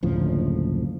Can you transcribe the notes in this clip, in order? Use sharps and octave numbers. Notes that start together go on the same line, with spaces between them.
F#1 D2 A2 F3